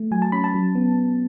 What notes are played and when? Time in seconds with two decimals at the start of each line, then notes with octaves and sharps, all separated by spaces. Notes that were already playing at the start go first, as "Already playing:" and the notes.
Already playing: A3
0.11 F#3 G#5
0.22 A5
0.32 C#4 B5
0.44 A5
0.54 F#3
0.75 B3